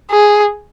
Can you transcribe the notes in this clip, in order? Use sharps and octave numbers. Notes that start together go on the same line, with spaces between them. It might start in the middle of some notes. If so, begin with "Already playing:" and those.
G#4